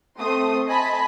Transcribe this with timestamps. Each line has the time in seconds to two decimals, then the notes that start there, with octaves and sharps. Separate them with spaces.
0.19 A3 C4 C6 D#6
0.67 D#5 G#5 A5 B5 B6